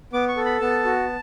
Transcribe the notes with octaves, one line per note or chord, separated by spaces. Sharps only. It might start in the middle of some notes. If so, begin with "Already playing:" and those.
B3 D6
C#6
A4
B5
B3 A5
F#4